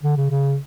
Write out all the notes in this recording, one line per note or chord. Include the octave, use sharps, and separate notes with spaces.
D3
C#3
C#3